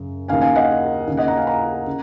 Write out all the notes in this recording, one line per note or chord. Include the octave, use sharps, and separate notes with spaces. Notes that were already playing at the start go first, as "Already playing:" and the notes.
Already playing: F#2 C#3
D#2 C#3 F5 G#5
F5 G#5
D#5 F#5
D#2 C#3
D#5 F#5
F#5 A#5
F5 G#5
F#5 A#5
C#3